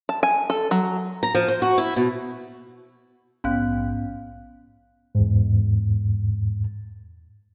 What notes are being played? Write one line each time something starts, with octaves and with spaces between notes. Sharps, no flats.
A5
G#5
A4
F#3
A#5
F3
C5
F#4
E4
B2
A#1 G#2 B3 C#4 F5 F#6
E2 G#2